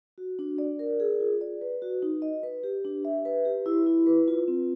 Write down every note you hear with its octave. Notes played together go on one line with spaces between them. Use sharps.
F#4
D4
D5
A#4
G#4
F4
D5
B4
F#4
D#4
D#5
B4
G4
D4
E5
B4
G4
E4
E4
B4
F4
C4